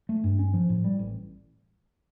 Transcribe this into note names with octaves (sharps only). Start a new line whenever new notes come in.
A3
G2
C#4
F3
A2
G3
A1